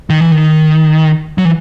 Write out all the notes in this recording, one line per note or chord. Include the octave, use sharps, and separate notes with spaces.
D#3
E3
D#3
F#3
E3